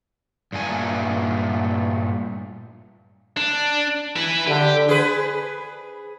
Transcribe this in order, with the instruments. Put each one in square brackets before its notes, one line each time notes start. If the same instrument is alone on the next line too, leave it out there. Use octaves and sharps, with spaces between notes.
[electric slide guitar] G2 A#2 A3 G#5
[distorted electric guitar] D4
E4 B4
[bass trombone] D3 [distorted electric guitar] G4
[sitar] G#4 B4